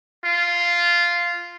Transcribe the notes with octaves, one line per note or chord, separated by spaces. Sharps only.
F4